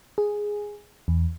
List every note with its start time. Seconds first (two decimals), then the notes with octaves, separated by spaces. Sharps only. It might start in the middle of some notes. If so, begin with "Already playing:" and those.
0.18 G#4
1.08 E2